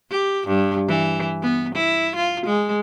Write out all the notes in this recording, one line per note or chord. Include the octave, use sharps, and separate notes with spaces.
G4
G2
E3
B3
E4
F4
G#3